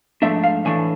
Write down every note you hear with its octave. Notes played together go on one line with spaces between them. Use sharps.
G#2 F3 A3 D4 E5
F5
A2 E3 A3 D4 G#5